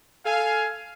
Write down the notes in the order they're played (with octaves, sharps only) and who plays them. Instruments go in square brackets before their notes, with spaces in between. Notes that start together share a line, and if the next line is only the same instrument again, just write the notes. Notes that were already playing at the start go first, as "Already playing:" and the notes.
[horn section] A4 F5 G#5